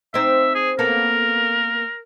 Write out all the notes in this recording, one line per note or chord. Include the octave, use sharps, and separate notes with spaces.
C4 D#4 E5
G#4
A#3 B3 A4 A#4